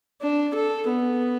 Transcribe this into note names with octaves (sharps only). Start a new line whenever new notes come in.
D4
A4
B3